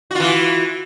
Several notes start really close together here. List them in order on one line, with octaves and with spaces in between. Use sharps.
F#4 F4 E3